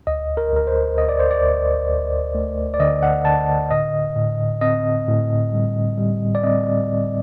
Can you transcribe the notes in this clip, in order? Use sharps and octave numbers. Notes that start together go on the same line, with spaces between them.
D2 D#5
A#4
D2 A#4
C5
D2 D#5
D5
C5
D5
D2
D2
A3
D5
D3 D#5
F#5
D3 A5
A2 D#5
A2
C4 D#5
A2
G3
G3
D5
C4 D#5